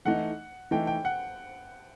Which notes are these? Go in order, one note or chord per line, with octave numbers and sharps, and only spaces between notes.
E3 A3 D#4 F#5
E3 A3 D#4 G5
G5
F#5